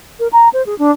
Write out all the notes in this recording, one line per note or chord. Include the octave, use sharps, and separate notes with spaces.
A#4
A#5
C5
G#4
D4